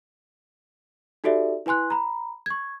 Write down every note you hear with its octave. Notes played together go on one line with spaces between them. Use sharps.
D#4 F#4 G4 A4 D5 E5
E4 B4 G#5 C6 F#6
A#5 B5
C#6 G#6